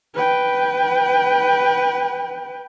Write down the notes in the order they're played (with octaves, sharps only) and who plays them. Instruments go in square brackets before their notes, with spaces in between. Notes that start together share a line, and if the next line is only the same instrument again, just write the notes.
[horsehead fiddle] B4 G5